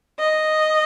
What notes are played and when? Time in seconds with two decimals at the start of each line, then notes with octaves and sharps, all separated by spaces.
0.20 D#5